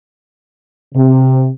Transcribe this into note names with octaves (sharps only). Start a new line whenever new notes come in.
C3